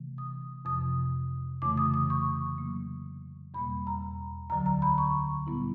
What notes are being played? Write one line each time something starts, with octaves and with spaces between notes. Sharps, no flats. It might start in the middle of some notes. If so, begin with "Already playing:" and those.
Already playing: C3 E3 A3
D#6
F2 C3 F3 D#6
F2 C#3 E3 A3 D6
D#6
D#6
C#6
C#3 F#3 A#3
E2 B2 G3 A#3 B5
A#5
D2 D3 F#3 A#5
A#5
B5
C#6
A#2 G3 B3 E4